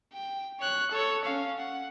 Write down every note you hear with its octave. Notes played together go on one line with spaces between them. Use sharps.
G5
C#5 F#6
A4 C#5
C#4 F5
F#5